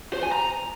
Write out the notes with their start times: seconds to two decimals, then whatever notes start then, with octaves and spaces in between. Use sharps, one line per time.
0.14 C5
0.23 G#5
0.32 A#5